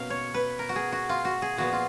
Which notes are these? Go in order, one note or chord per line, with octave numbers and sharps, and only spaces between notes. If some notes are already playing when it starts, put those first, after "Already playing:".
Already playing: B2 A#3 C#4 F5
C#5
B4
A#4
F#4
G#4
F#4
F4
F#4
G#4
A#2 F3 B3 F#4
F4